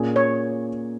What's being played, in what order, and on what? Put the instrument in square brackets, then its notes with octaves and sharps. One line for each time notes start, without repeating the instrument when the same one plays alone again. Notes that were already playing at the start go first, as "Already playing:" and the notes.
Already playing: [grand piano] A#2 A#3 C#4 G#4
[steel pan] C#5